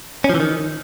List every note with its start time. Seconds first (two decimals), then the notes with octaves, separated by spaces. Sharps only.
0.24 C#4
0.30 F3
0.35 E3
0.40 D#3